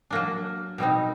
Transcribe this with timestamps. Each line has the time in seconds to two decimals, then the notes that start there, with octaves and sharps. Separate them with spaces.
0.10 F#3 A#3 D4
0.78 B2 G3 C4 D#4